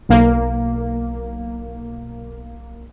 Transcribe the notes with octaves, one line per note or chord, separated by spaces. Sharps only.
B1 A#3